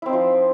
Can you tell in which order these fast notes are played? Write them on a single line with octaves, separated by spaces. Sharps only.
E4 C4 D#4 F3